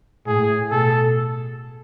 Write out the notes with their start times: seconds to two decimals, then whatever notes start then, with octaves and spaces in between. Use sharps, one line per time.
0.26 A2 G#4
0.71 B2 A4